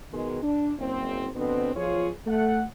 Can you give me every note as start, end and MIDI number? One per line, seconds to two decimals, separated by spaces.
0.12 0.39 47
0.12 0.39 51
0.12 0.39 56
0.42 0.73 62
0.79 1.28 30
0.79 1.28 60
1.35 1.72 47
1.35 1.72 50
1.35 1.72 59
1.35 1.72 60
1.75 2.10 35
1.75 2.10 53
1.75 2.10 65
1.75 2.10 68
1.75 2.10 73
2.27 2.63 57
2.27 2.63 78